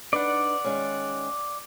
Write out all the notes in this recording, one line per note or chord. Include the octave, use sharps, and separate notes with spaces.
D4 D#4 B4 D5 F#5
D#3 G#3 C#4